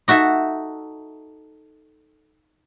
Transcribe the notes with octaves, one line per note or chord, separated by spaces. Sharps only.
D#4 F#4 A4 E5